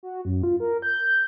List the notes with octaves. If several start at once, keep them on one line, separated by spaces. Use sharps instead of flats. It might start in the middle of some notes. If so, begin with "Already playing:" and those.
F#4
F#2
F4
A#4
G6